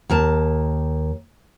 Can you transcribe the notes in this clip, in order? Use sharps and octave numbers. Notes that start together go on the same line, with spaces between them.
D#2 A#4 A5